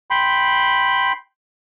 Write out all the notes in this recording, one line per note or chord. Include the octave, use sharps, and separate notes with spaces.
G5 B5 C6